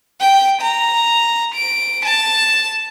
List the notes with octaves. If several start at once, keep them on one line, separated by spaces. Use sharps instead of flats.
G5
A#5
D7
A5